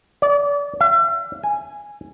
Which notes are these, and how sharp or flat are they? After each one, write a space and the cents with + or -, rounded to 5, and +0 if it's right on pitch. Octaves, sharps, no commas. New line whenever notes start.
D5 -35
E5 +40
G#5 -5